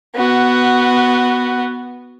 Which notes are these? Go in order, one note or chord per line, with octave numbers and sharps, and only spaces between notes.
B3 F#4